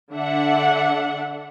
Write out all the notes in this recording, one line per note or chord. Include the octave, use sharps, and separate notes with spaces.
D3 D4 E5 F#5